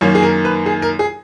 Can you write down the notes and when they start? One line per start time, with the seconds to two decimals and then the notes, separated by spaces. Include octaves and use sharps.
0.01 F#2 D#3 A#3 C#5
0.15 G#4
0.23 A#4
0.45 B4
0.66 G#4
0.82 A#4
0.99 G#4